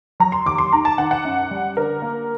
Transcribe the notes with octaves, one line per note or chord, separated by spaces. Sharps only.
F#3 A#5
C6
D#2 D6
C6
D#3 A#5
A5
D#3 F#5
F#5
F#2
G3
D3 A#4
A#3